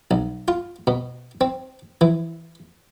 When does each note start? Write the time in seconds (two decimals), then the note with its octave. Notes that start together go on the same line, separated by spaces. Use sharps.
0.11 B1
0.48 F4
0.87 B2
1.41 C4
2.01 E3